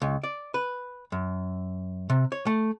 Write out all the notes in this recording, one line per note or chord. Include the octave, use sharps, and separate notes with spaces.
C#2
D5
B4
F#2
C3
C#5
A3